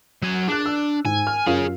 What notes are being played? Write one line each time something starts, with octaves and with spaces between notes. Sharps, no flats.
F#3 G#5
D4 G#4 F#6
E6
G#2 G#5
F6
F#2 F4 G#4 C#5 F5